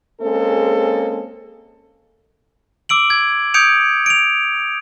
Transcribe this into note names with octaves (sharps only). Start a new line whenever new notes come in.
G#3 A#3 C4 C#4 G#4 A4
D6 E6 D7 F#7
G#6
D#6 G6 G#6 C#7 D7 F7
D7 F7